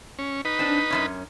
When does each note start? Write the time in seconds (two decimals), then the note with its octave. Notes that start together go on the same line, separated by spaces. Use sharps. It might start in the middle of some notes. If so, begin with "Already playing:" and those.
0.19 C#4
0.45 D#4 B4
0.59 C4 D4
0.90 F#2 B2 C#4